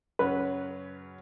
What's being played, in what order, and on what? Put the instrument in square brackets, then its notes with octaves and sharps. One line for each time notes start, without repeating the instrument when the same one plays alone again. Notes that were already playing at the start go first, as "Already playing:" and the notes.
[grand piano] F#2 C#3 F#3 C#4 [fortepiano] B4